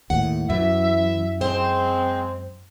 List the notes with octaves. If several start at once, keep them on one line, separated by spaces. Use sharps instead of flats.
D#2 A2 F#5
F#2 E3 E5
G#3 C4 C5